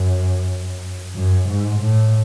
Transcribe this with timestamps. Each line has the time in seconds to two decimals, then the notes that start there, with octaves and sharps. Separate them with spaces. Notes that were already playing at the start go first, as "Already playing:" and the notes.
Already playing: F#2
1.16 F#2
1.50 G#2
1.82 A2